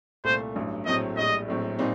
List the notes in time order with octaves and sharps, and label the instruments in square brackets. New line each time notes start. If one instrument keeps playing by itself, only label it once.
[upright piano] C2 A#2 A3 [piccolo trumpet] C5
[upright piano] A1 G2 F#3
[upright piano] A#1 A2 F#3 A3 C4 [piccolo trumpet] D#5
[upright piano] A#1 A2 G3 [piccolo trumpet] D#5
[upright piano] A#1 A2 F#3 C4
A#2 G3 C4 D#4